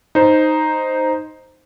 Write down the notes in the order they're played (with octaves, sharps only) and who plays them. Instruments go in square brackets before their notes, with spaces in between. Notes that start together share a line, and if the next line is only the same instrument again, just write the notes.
[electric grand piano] D#4 C5